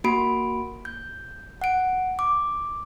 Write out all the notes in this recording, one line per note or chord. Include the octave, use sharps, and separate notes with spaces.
A#3 F#4 B5 D7
G6
F#5 D7
D6